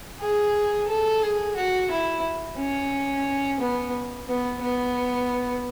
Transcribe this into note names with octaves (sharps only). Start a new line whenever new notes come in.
G#4
A4
G#4
F#4
E4
C#4
B3
B3
B3